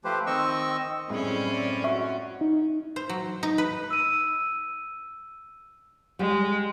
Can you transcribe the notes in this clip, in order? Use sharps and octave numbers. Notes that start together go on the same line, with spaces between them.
F3 A3 G4 B4 C5
D#3 C4 D#5 C#6 E6
F#2 A2 G3 G#3 C4 C#4
D5
F#4 E5 C#6
D#4
C5
F#3
D#4
B4
E6 D#7
G3 G#3